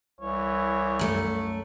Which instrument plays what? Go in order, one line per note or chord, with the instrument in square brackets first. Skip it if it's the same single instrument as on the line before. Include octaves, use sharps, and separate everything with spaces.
[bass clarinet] C2 [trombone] E3 [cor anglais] C#5
[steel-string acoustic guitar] F#2 A3